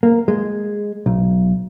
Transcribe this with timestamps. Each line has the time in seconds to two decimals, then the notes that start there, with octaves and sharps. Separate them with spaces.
0.03 A#3
0.28 G#3
1.06 B1